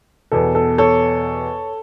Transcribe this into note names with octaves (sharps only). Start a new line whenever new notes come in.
E2 B2 A4
A4
A4 C#5